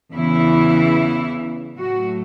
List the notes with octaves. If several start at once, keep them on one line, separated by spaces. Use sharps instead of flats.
E2 C#3 E3 E4
A2 F#3 A3 F#4